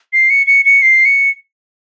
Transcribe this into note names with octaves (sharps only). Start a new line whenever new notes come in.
C7
C#7
C#7
C#7
C7
C#7